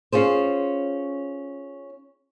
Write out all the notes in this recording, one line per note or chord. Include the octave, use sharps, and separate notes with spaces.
C#4 F4 G#4 C5